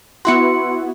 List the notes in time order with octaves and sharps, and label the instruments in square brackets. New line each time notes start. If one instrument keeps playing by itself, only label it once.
[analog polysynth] B3 E4 F#4 [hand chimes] C6 C#7